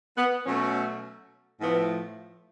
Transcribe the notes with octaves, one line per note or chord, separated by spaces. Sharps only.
B3
B2 F#3 A3 C#4
A2 F3 A3 B3